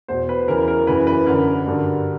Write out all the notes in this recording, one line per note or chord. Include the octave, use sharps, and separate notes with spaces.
E2 B2 C5
B4
E2 C#3 E3 A#4
A#4
F#2 C#3 E3 B4
B4
F#2 D3 A#4
G2 D3